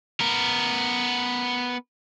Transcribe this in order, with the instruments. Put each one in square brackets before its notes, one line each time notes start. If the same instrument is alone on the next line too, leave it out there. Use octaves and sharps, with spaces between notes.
[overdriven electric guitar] B3 A#4